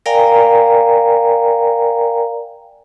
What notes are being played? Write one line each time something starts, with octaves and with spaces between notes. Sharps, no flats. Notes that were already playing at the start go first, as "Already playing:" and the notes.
A#4 D5 F5 G5 G#5 A#5